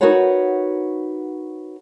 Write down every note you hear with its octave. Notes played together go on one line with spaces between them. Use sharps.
D#4 F#4 A#4 B4 C#5 F#5